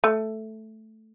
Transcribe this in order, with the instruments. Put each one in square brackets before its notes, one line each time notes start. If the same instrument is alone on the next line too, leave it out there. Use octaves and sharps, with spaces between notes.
[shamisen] A3